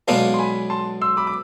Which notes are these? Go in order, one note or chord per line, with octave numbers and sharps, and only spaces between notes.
B1 B2 G#3 B3 D4 F5 A5
C6
G#5 B5
A5 C6
C6 E6
B5 D6
D6